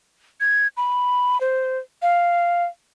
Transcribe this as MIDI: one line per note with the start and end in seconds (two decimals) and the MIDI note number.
0.40 0.67 92
0.77 1.40 83
1.41 1.78 72
2.02 2.64 77